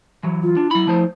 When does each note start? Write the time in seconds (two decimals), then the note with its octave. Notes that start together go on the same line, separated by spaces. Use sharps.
0.23 E3 F#3
0.43 F4
0.57 D4
0.71 F#3 E4 B5
0.87 F3 A3 C5